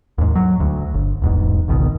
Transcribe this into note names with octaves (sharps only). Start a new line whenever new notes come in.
D#2 G#2
F#3
D2
G1
D1 E2 G#2
G#1 C#2 B2 D#3